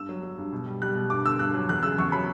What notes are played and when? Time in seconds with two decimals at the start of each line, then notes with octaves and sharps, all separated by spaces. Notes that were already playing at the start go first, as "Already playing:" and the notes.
Already playing: G2 E6
0.09 F#3
0.23 F#3
0.38 G2
0.52 B2
0.66 G3
0.82 G3 F#6
0.95 B2
1.10 G2 D6
1.25 D3 E6
1.39 G2 F#6
1.54 F#3
1.69 E2 F#6
1.83 C#3 E6
1.98 E2 C#6
2.12 F#3 B5